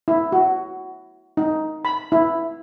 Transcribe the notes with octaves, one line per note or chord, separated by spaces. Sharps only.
E4
F#4
D#4
B5
E4